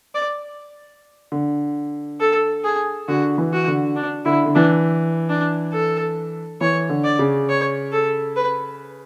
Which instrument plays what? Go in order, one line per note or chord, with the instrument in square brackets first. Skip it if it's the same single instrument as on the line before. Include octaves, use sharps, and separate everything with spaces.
[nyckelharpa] D5
[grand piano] D3
[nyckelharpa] A4
G#4
[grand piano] D3 [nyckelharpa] F#4
[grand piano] E3
[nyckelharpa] F#4
[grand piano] D3
[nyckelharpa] D4
[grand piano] D3 [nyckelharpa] E4
[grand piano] D3
[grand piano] E3 [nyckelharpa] D4
[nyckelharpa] D4
A4
[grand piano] E3 [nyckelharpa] C#5
[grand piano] D3
[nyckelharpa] D5
[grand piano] C#3
[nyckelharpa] C#5
A4
B4